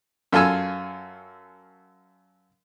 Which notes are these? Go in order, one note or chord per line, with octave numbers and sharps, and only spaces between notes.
F#2 F4 A4 G#5 E6